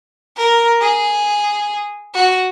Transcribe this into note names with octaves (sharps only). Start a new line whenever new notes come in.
A#4
G#4
F#4